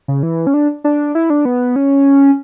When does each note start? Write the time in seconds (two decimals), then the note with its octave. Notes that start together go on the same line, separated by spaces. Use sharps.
0.08 C#3
0.23 E3
0.47 C#4
0.54 D4
0.84 D4
1.15 E4
1.30 D4
1.45 B3
1.76 C#4